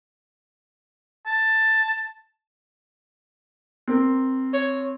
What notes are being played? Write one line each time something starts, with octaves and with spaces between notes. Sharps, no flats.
A5
C4 A#4
C#5